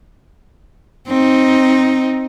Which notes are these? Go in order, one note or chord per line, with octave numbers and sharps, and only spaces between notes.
C4 D#4